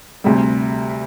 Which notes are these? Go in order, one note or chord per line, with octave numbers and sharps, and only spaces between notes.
D2 C3 G3